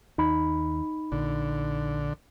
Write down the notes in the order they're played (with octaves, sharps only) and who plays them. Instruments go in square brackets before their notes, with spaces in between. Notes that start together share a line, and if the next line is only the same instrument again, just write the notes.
[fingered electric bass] D#2 [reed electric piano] D#4 B5
[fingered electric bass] A#1 [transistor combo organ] D3